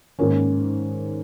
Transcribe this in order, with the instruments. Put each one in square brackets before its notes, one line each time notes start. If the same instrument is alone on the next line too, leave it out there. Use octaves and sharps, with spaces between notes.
[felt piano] G#2 D#3 A#3 C#4